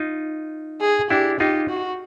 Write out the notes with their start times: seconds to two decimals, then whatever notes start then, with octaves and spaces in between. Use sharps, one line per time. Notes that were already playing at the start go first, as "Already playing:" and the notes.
Already playing: D#4 F4
0.81 G#4
1.10 D4 E4 G4
1.40 D#4 F4 G4
1.69 F#4